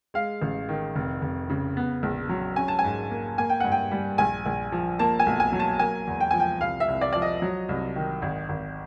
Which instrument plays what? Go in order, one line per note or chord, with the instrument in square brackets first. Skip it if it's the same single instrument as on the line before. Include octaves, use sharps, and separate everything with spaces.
[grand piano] G#3 F5
A1
D#3
F1
F1
C#3
B3
A#1
F#3
C#4 G#5
A5
G#5
G#2
A#3
A#3 G#5
G5
G2 F#5
G5
G3
A#1 G#5
A#1
F3
A#3 A5
G#5
B1
G#5
F#3
A5
A#3 G#5
E2
G5
F3 G#5
G5
C2 F5
E5
C2
D5
F3 D5
D#5
F#3
C2
D#3
G#1
G#1